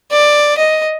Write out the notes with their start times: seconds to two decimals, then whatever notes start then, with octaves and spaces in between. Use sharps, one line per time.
0.12 D5
0.57 D#5